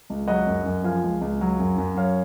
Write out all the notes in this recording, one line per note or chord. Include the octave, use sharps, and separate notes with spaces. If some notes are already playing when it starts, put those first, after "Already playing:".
C#2
F#3 D#5 F#5
F#2
F#2
F3 F5 G#5
C#2
C#2
F#3
F#2
F#2
F#3 C#5 F5